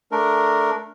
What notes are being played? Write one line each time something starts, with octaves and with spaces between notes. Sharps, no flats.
A3 D4 A#4